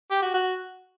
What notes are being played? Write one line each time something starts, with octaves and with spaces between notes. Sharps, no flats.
G4
F#4
F#4